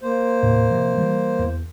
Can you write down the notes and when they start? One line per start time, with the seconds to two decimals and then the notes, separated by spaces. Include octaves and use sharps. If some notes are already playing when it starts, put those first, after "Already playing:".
0.01 A#3 C5
0.43 D#2 A2 C3
0.71 C3 F3
0.97 E3 G3
1.39 E2